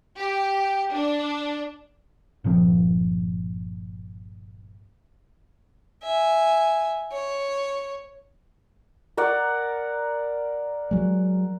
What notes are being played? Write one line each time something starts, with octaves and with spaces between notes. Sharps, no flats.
G4
D4
G1 A#2 F3 C4
E5 G#5
C#5
A#4 D5 F#5
F#3 G#3